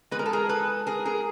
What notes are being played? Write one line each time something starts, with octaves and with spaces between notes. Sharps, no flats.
E3 G#3 B3 B4
A#4
A4
G#4 A#4
A4 B4
G#4 A#4
G#4 A#4